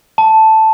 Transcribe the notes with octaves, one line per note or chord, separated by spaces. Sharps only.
A5